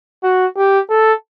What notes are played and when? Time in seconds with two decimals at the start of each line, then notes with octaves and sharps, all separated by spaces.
0.24 F#4
0.57 G4
0.90 A4